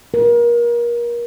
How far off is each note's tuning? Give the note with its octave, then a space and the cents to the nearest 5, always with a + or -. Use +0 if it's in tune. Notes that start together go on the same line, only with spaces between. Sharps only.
A#4 +30